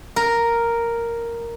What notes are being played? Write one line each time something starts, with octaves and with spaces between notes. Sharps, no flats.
A#4